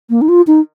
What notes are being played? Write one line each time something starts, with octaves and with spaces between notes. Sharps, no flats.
A#3
D#4
F4
D#4